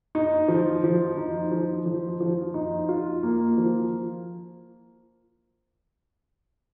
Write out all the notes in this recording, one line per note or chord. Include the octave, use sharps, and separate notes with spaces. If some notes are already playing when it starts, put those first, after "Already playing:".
D#4
F3
F3
D#4
F3
F3
F3
D#4
F4
A#3
F3